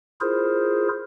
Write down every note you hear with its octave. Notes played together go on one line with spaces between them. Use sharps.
E4 F4 G#4 A#4 C5